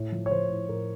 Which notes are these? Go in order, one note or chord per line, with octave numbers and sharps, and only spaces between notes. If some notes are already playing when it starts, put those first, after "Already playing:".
Already playing: A2
F3
C#5
F3 C5
A2
A2 A#4